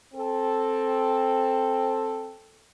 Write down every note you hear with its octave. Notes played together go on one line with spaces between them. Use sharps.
C4 A4